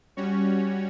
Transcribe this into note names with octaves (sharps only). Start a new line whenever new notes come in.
G3 C#4 F#4 C#5